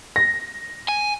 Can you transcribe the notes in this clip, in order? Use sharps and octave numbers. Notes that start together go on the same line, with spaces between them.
A#6
G#5